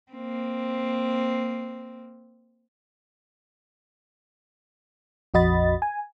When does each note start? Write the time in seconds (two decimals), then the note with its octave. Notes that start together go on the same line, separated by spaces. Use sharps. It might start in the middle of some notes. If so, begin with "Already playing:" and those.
0.12 A#3 C4
5.34 A#1 F2 F#4 D#5 B5 A6
5.82 G#5